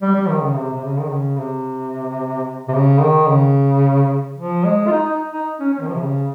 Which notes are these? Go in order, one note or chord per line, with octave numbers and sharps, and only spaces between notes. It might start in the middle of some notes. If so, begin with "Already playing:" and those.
G3
G3
D#3
C#3
C3
C3
C#3
D#3
C#3
C3
C3
C#3
D#3
C#3
F3
G#3
F4
D#4
D#4
D#4
C#4
C#4
D#3
F3
C3
C#3